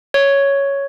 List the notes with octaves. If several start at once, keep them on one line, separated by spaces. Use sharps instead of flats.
C#5